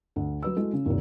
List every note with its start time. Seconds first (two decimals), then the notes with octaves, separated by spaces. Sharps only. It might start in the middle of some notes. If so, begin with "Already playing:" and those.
0.16 D2
0.43 F#3 B4 E6
0.57 G#3 E4 F#4 A4
0.73 C#3
0.86 F1 D#2